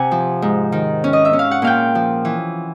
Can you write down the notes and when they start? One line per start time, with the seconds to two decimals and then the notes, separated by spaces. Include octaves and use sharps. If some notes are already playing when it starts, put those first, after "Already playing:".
Already playing: C3 F#5 G#5
0.11 F3
0.42 G#2
0.72 D#3
1.04 C#4
1.13 D#5
1.25 E5
1.33 C#4
1.39 F5
1.51 F#5
1.62 A#2 F5 G5
1.95 F3
2.25 E3